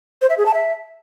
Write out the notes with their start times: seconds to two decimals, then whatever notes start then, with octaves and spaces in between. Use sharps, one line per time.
0.22 C5
0.30 E5
0.38 G#4
0.46 A5
0.54 E5